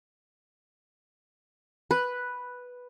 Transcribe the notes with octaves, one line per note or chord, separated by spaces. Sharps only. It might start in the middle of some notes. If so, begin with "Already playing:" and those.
B4